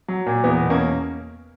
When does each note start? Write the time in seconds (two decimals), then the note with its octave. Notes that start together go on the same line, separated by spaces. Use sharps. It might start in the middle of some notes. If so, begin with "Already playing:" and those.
0.08 F#3
0.26 A#2
0.44 E2 B3
0.61 B2
0.70 A#3 C#4